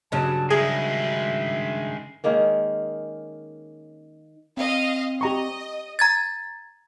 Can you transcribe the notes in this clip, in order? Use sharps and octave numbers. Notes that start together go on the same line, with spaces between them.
G2 C#3 F#3 A5
D#3 G#3 G#4 E5
D#3 G#3 A#3 C#4
C4 D#5 F5
G4 D#5 A#5 C#6
A#5 G#6 A6